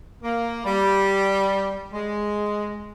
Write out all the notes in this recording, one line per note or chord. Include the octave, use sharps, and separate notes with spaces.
A#3
G3
G#3